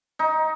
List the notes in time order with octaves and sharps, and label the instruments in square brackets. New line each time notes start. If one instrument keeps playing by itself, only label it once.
[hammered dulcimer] D#4